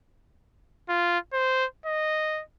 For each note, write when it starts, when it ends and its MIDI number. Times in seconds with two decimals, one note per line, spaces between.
0.89 1.18 65
1.33 1.65 72
1.86 2.42 75